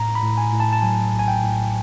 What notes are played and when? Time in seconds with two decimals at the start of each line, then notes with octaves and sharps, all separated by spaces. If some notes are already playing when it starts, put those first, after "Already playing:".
Already playing: A2 A#5
0.15 B5
0.22 A2
0.38 G#5
0.53 A2
0.60 A5
0.73 A5
0.82 F#3 G#5
1.13 A#1
1.19 G#5
1.28 G5
1.43 A2